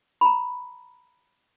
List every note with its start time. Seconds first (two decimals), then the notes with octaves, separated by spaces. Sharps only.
0.21 A#5 B5